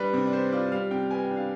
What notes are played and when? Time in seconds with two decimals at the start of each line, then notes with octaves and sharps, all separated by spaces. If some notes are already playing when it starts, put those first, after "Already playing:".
Already playing: G3 D4 B4
0.13 C3
0.27 D5
0.33 B3 C5
0.52 F4 D5
0.72 G3 F5
0.91 C3 G5
1.10 B3 G#5
1.24 G5
1.30 D4
1.37 F5